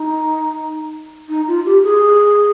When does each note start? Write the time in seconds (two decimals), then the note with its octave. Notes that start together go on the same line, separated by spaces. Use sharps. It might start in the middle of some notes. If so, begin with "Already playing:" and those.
Already playing: D#4
1.29 D#4
1.48 F4
1.65 G4
1.84 G#4